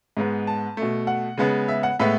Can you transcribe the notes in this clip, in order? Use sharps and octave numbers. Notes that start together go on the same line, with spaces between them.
G#2 G#3 B3
A5
B2 A3
F#5
C#3 G#3 B3
E5
F#5
A2 G#3 B3 E5